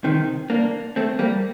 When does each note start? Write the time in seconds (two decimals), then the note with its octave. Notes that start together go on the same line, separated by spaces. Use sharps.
0.04 C3 D#3
0.50 A#3 D4
0.96 A3 C4
1.19 G3 A#3